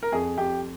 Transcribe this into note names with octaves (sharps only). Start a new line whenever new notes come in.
A#4
F2 G#4
F2 G4